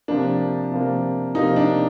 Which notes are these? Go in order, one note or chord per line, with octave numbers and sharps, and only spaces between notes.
C3 F3 A#3 D4
C3 F3 A#3
C3 F3 A#3 D#4
D4